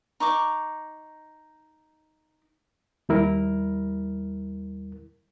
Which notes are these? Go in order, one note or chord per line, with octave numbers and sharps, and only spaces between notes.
D#4 C#6 D6
D#2 G3 E4 A#4